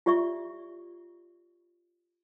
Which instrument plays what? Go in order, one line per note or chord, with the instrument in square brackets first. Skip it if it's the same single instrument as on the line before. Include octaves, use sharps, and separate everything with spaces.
[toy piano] F4 G4 D5 E5 C#6